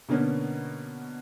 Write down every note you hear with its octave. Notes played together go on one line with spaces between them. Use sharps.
B2 D3 A#3 B3 C#4